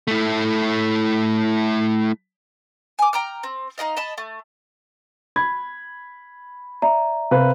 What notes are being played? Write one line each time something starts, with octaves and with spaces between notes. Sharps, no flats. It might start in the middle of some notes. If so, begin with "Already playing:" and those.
A3 E4
G#5 D6
G5 A#5 F6
C4
D#4 G4 D#5 F5
D#5 A5 B5
A3
B5 G#6
D5 E5 A#5
C3 C4 B4 F5